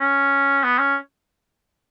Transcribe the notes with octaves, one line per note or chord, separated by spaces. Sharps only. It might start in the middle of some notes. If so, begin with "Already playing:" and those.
C#4
B3
C#4